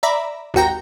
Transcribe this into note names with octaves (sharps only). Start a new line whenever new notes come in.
D5 E5 A#5 B5
G#1 D#2 F#4 G5 A#5